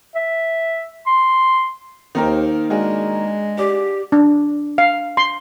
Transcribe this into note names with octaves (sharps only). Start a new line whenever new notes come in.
E5
C6
D#2 D#3 A#3 D#4 A#4 C5 G5
G#3 D4 F#4 G#4
G4 D5 D6
D4
F5
C6